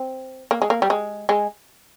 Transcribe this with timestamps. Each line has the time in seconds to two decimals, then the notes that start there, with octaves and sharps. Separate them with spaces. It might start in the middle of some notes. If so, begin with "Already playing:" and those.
Already playing: C4
0.51 A#3
0.62 G#3
0.70 A#3
0.82 G3
0.90 G#3
1.29 G#3